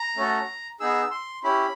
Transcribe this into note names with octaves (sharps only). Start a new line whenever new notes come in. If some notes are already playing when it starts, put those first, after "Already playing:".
Already playing: A#5
A3 C#4 F#4 A4
B3 D#4 G#4 E6
C6
C#4 E4 G4 B5